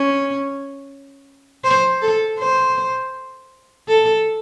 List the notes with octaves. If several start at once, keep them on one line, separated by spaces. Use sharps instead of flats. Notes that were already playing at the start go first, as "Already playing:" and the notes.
Already playing: C#4
C5
A4
C5
A4